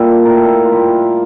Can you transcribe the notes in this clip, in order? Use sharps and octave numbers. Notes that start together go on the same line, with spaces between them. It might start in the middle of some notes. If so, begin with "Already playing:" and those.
Already playing: A#2 G3 A#3 A4 E5
A2 G3 A#3 A#4
A4
A#4
F4
A2 G3 A#3 G4